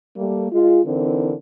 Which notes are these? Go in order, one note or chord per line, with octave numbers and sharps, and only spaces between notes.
G3 A3 A#3
G#3 F4
D3 E3 C4 D#4 E4 A#4